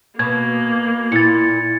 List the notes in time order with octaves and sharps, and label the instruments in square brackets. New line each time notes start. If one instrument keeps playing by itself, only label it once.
[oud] B2 [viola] A#3 [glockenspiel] G#6
[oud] A#2 [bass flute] E4 [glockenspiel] A6 C#7